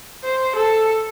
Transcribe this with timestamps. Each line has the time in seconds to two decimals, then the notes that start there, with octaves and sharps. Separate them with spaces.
0.24 C5
0.56 A4